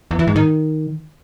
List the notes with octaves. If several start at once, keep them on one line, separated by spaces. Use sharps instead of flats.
E2
E3
G#2
D#3